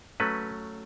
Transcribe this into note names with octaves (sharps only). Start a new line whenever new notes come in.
F#3 A3 C#4 B4